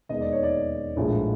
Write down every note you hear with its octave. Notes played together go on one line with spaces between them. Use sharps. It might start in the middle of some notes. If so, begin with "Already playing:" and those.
E1 D#2 D#3 G#3 B3 D#5
D5
C#5
D5
A#1 A2 F3 G#3